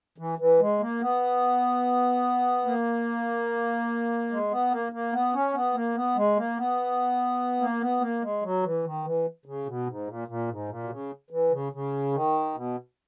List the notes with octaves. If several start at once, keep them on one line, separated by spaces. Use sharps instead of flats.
E3
E3
G#3
A#3
B3
A#3
G#3
B3
A#3
A#3
B3
C#4
B3
A#3
B3
G#3
A#3
B3
A#3
B3
A#3
G#3
F#3
E3
D#3
E3
C#3
B2
G#2
A#2
A#2
G#2
A#2
B2
C#3
E3
C#3
C#3
D#3
B2